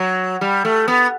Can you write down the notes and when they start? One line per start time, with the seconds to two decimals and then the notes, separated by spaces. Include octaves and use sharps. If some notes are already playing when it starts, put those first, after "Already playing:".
Already playing: F#3
0.41 G3
0.65 A3
0.88 B3